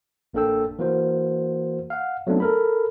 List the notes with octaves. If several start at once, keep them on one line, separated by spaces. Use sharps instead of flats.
A1 A#3 D4 A4 G5 E6
E3 A#3 F#4 C5
F5 F#5
F#3 A3 B3 C4 D4 D#4
A4 A#4 B5